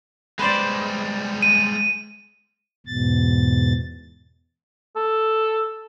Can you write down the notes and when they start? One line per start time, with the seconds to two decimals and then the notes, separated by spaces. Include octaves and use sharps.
0.39 G3 G#3 B4 C5 D5
1.42 D#7
2.86 E2 G#2 B2 A6
4.96 A4